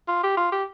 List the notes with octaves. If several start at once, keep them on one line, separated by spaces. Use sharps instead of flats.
F4
G4
F4
G4